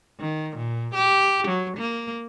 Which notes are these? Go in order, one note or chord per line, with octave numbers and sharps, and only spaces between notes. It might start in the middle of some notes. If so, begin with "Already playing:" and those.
D#3
A#2
G4
F#3
A#3